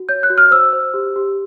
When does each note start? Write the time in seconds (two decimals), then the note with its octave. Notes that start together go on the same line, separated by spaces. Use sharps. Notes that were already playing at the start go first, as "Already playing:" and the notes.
Already playing: F#4
0.09 C#5 G6
0.23 F#6
0.30 F#4
0.38 F6
0.51 C5 E6
0.73 C5
0.94 G4
1.16 G4